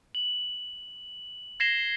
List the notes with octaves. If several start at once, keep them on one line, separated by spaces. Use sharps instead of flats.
F#7
G#6 A#6 C7 E7 G7